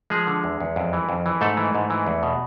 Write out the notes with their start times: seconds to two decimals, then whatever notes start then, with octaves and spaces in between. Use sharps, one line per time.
0.10 F3 G#3 G#4
0.27 D3
0.44 E2
0.60 E2
0.76 F2
0.93 E3
1.09 F2
1.26 E3
1.41 G#2 A3 A4
1.57 E3
1.75 G#2
1.90 E3
2.06 E2
2.23 B2